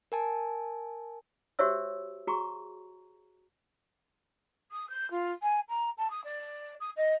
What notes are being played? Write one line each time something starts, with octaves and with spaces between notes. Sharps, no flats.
A#4 G#5 A5
F#4 G4 C5 C#5 E5 E6
F#4 G#4 A#5 C#6
D#6
G6
F4
G#5
A#5
A5
D#6
D5
D#6
D#5